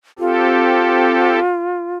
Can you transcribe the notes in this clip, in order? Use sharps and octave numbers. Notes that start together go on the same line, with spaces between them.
C4 F4 G4 A4